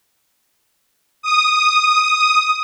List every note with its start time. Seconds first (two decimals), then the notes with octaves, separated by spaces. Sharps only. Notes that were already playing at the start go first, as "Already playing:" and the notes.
1.22 D#6